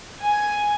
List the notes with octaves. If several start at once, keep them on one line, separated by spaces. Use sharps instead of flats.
G#5